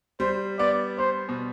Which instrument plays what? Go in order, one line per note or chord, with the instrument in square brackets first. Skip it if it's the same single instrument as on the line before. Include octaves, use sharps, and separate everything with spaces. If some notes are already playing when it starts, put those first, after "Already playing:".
[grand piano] G3 [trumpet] C5
[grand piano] B3 [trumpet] D5
[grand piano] B3 [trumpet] C5
[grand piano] B2